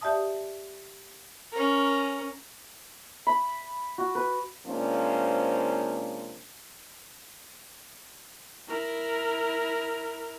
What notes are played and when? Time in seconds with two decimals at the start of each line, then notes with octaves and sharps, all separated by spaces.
0.01 G4 D5 E5 A5 D#6
1.52 C#4 A#4
3.27 B5
3.98 F#4
4.15 B4
4.67 C3 F3 G#3 A#3 C#4 D4
8.68 E4 A#4